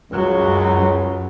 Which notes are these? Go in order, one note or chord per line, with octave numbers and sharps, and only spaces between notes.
C#2 F#2 F#3